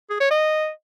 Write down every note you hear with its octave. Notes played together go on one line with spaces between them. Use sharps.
G#4
C#5
D#5